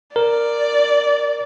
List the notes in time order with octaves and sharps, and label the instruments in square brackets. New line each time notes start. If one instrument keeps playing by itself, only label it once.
[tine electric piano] A#4 [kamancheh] D5